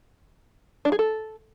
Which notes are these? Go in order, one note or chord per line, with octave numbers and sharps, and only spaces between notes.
D4
G#4
A4